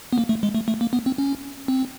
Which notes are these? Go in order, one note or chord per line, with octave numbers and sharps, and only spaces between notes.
B3
A#3
A3
G#3
A3
A3
A#3
B3
C4
C#4
C4